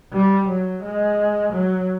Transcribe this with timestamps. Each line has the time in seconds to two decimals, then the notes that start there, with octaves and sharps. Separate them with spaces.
0.13 G3
0.48 F#3
0.83 G#3
1.53 F#3